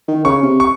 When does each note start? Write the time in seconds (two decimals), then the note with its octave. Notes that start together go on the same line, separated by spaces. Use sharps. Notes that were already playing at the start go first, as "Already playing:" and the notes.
0.08 D#3
0.24 C#3 C#6
0.42 C3
0.60 C#6